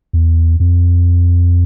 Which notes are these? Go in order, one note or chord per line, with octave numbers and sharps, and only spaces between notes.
E2
F2